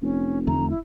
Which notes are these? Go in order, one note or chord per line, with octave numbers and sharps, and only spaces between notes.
F1 C#4
E2 D3 A3 A#5
E4